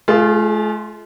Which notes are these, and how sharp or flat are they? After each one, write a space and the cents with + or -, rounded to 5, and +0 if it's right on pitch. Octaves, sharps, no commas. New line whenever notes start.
A3 -45 F4 -10 G#4 +0